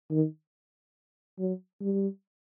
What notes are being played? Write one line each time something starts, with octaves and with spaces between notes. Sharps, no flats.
D#3
F#3
G3